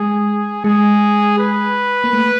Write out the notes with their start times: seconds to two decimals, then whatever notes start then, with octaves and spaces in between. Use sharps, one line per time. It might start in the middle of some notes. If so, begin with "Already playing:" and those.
Already playing: G#3 G#4
0.64 G#3 G#4
1.38 B4
2.04 A#3
2.13 A3